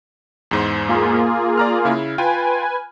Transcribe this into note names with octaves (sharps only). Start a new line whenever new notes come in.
E2 G#2 C5
A#3 F4 G#4
D5 A#5 F6
C#3 E4
F4 B4 G5 G#5